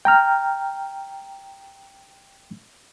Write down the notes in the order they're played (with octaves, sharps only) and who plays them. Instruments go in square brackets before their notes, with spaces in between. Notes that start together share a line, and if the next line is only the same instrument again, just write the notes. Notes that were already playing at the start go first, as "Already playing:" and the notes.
[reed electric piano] G5 A#5 F6